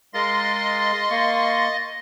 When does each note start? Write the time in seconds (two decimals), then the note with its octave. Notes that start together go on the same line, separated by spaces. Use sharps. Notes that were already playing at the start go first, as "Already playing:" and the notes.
0.14 G#3 A#4 D#5 F5 C6 A6
1.10 A#3 C#6